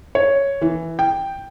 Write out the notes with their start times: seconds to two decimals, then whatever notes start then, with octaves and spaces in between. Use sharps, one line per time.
0.15 C#5
0.61 E3
0.99 G5